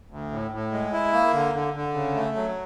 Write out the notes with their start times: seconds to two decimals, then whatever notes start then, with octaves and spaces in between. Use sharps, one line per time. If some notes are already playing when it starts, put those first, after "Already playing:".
0.10 D2
0.31 A2
0.51 A2
0.72 G#3
0.92 E4
1.13 A#3
1.33 D3
1.54 D3
1.74 D3
1.94 C#3
2.14 A3
2.36 F#3